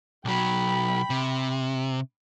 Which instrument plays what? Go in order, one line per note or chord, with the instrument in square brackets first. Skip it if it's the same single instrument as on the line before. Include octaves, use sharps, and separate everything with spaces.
[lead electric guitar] B1 F#3 [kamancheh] G5 B5
[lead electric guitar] C3